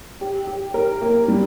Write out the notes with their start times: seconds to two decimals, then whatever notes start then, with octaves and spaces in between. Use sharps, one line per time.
0.21 G4
0.47 G4
0.74 A#4
1.01 A#3
1.28 G3